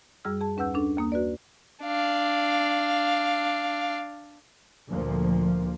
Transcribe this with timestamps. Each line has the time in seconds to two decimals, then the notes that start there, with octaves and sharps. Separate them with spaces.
0.25 F#2 G3 G#4 E6 F6
0.41 G#4 A5
0.57 D#2 C#4 B4 F#5 E6 G6
0.75 C#4 D4 A4
0.97 D#2 A#3 D#6
1.12 F#4 B4 D5
1.83 D4 F5
4.91 D2 A#2 F3 A#3